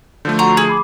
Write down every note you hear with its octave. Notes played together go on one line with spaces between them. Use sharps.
D3 F3 A3 G6
F#4 F#5 A#5 C6 C#6
G#4 G#6
B5 D6